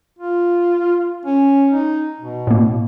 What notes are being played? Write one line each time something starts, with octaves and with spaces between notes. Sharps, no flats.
F4
C#4
D#4
B2
A2 A#3